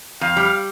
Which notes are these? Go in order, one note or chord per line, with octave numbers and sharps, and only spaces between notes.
F2 F5
G3